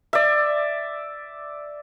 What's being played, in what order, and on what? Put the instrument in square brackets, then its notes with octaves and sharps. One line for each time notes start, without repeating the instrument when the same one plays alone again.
[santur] D5 E5